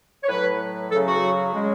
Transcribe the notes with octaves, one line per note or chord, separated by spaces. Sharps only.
C#5
A2 F#3 B4
C#3 F#3 A4
F#4
C#3 G#3